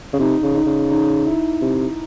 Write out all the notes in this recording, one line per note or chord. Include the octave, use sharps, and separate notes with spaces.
C#3
C3 D#4
C#3
D#4
C#3
D#4
E4
C3